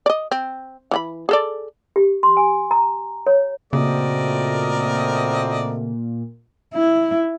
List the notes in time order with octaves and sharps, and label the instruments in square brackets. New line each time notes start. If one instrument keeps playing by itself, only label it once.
[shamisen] D5 D#5
C4
E3 F#4 B5
G#4 A4 D5
[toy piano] G4
C6
G#5
A#5
C#5
[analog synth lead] A#2 [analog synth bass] C#3 [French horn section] A3 C4 F#4 [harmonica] A#4 D5 D#5
[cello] E4